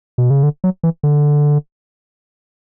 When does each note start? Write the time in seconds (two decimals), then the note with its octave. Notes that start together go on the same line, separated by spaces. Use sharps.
0.18 B2
0.30 C#3
0.43 D3
0.64 F#3
0.83 E3
1.03 D3